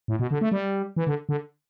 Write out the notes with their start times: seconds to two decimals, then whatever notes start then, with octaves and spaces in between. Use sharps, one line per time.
0.08 A2
0.19 B2
0.31 D3
0.41 A3
0.52 G3
0.96 E3
1.07 D3
1.29 D3